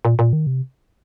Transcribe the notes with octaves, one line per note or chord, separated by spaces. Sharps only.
A#2
A#2
D#3
C3